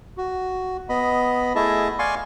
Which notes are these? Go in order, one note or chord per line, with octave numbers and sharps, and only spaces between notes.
F#4
B3 D#5 B5
A3 E4 G#4 D#5 E5 A5
D5 F5 G#5 C6 C#6